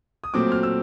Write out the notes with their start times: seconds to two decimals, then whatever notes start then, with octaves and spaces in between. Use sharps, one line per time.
0.24 D#6
0.34 A#2 F#3 A3 C4 D6
0.52 F6
0.63 E6